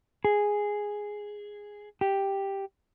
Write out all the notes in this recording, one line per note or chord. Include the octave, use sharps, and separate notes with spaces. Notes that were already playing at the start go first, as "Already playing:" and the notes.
G#4
G4